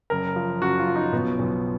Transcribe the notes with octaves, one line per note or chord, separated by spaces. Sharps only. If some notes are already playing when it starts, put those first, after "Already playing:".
F#1 A#4
F3
F#1 F#4
F4
F3
D#4
B1 B3
B1